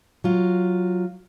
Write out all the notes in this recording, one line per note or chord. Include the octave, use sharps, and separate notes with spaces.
F#3 F4